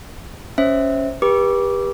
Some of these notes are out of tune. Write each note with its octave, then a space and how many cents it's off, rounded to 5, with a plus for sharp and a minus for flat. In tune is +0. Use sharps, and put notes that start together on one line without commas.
C#4 +0 C5 +0 E5 -15
G4 +20 B4 -35 D6 -10